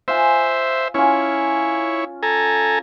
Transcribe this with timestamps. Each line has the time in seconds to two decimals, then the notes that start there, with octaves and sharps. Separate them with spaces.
0.08 F4 C5 E5 G#5
0.94 C#4 E4 F4 C#5
2.23 A4 G#5 A#5